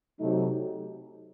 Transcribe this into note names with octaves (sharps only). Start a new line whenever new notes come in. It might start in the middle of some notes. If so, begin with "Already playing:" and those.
C3 F#3 A3 D#4